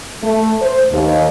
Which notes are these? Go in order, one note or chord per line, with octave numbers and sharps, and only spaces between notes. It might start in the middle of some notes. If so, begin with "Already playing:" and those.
A3
C5
D#2